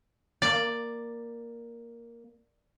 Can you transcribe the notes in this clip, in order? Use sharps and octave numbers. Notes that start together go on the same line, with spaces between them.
A#3 D5